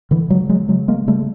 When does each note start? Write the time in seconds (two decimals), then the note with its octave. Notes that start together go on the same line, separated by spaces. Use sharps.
0.11 D3 E3
0.30 C#3 F#3 G#3
0.49 F#3 G#3
0.69 C#3 F#3 G#3
0.88 G#3 A#3
1.07 C#3 G3 A3